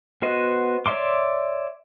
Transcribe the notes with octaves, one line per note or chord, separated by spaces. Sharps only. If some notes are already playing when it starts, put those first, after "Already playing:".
B3 F#4 C5 D#5
C#5 D5 E5 C6 D6